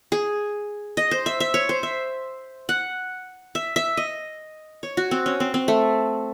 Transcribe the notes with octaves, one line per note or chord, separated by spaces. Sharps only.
G#4
D#5
C5
E5
E5
C#5
C5
E5
F#5
E5
E5
D#5
C#5
F#4
C4
C#4
C4
C4
A3